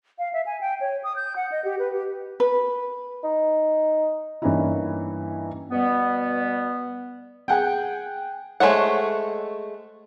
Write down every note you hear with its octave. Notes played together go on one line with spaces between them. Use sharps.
F5
E5
G#5
G5
C#5
D#6
G6
F#5
D#5
G4
B4
G4
B4
D#4
G2 E3 A#3 C#4 D#4 E4
B2 G3 B3
G#4 F#5 G5
G#3 A3 C5 C#5 F#5